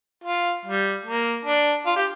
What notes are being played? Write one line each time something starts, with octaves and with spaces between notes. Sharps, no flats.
F4
G3
A#3
D4
F4
G4